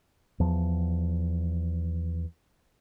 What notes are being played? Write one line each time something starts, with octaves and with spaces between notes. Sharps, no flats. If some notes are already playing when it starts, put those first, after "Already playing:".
E2 F3